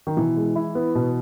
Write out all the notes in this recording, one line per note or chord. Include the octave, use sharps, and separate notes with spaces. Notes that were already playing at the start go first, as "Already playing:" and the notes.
D#3
B2 E3
G#3
E4
B3
B2